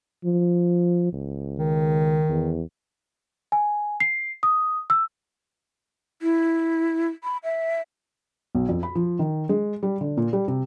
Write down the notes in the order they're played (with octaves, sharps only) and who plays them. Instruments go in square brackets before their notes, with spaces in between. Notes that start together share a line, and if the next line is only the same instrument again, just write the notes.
[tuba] F3
C#2
[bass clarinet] D#3
[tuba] E2
[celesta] G#5
C7
D#6
E6
[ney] E4
B5
E5
[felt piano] B1
F2
B5
F3
D#3
G#3
G3
D3
A#2
G3
C3